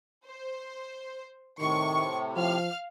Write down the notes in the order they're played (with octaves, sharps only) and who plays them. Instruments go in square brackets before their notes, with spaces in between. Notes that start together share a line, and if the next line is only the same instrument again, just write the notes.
[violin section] C5
[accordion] A2 C3 [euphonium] D#3 [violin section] C#6
[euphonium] F3 [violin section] F5 F6